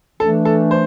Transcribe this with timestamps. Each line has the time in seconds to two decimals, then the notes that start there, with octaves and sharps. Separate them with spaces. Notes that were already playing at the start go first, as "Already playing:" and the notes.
0.20 E3 A3 D4 A4
0.45 A4
0.71 C5